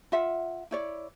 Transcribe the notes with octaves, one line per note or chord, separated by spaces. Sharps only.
F4 E5 F#5
E4 C#5 D5